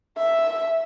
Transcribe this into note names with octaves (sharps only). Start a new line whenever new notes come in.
E5